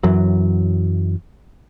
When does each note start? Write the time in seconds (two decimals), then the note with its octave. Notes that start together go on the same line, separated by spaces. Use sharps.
0.03 F#2 E3 F#3